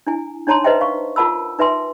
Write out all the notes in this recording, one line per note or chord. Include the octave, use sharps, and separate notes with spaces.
D4 E4 G#5
D4 D#4 C#5 A5 A#5 C6
B4 C5 D#5 E5 G5
F5 C#6
F4 A#4 F#5 A5 B5 E6
D#4 B4 E5 G#5 C6